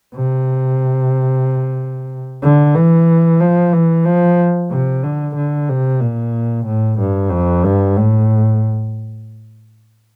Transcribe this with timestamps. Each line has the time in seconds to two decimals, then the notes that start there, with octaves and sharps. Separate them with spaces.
0.15 C3
2.42 D3
2.75 E3
3.40 F3
3.73 E3
4.06 F3
4.71 C3
5.04 D3
5.36 D3
5.69 C3
6.01 A#2
6.66 A2
7.00 G2
7.31 F2
7.65 G2
7.97 A2